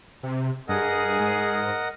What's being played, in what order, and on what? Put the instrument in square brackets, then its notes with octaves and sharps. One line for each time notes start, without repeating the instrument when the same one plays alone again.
[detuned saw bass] C3
[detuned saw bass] G2 [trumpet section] G#4 [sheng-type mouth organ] A#4 D#5 F#5
[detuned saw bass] G#2